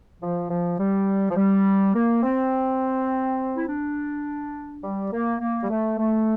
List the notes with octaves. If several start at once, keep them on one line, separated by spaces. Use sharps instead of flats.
F3
F3
G3
F3
G3
A#3
C4
E4
D4
G3
A#3
A#3
G3
A3
A3